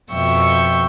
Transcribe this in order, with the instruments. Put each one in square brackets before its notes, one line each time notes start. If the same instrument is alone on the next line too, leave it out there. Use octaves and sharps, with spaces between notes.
[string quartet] F2 B2 E5 G5 C#6